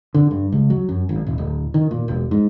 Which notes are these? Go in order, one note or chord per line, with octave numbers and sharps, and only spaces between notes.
D3
G2
C#2
F#3
F#2
G#1
D#1
D1
D#3
A#2
E1
G#2